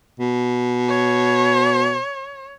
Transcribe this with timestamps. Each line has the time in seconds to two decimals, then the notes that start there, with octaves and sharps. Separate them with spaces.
0.20 B2
0.89 C#5